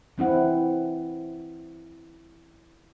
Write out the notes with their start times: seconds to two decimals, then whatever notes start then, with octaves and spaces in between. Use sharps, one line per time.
0.18 E3 C4 E4 F#5